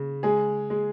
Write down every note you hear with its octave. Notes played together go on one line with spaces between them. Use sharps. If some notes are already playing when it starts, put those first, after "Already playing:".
Already playing: C#3
G#3 G#4
G#3